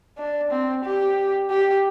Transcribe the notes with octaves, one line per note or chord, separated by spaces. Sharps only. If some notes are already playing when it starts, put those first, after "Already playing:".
D4
C4
G4
G4